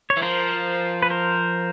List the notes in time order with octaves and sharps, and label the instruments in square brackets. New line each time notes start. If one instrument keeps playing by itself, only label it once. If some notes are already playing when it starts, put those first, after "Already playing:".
[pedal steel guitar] C#5
[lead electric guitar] E3
[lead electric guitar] F3 [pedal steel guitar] A#4 C5
[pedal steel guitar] B4
A#4 C5